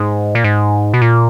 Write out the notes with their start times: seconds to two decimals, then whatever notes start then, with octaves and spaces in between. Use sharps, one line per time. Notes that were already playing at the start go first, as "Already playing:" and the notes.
Already playing: G#2
0.35 A#2
0.44 G#2
0.94 B2
1.02 A#2